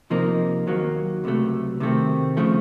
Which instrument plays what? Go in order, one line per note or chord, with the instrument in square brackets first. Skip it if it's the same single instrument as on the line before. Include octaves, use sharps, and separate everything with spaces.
[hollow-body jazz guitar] C3 F3 A#3 D#4
D#2 D#3 F#3 A#3
C#2 C3 F#3 A3
C3 D#3 A3 C4
C#3 F3 A3